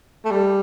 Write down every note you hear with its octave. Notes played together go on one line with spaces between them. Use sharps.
A3
G3